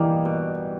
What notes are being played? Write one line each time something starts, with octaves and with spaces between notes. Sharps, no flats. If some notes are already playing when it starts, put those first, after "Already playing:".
Already playing: E3 G3 A#3 D#4
B2